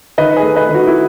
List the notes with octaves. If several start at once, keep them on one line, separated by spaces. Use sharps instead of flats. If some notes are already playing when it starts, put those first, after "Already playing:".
D#3 B4 D#5
G#4 B4
A3
B4 D#5
D#3
F#4
E4